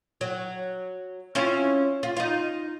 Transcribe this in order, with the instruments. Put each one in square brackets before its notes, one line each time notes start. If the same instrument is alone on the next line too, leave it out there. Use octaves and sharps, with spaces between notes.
[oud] F#3
C#4 E4 F4
F4
D#4 F4